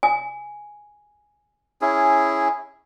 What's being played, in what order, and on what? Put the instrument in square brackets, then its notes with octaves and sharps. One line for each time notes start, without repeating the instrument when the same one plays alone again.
[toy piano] G#5
[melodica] C#4 E4 G#4